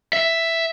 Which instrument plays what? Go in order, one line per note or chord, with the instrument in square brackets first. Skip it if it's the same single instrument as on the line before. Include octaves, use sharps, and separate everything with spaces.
[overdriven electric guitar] E5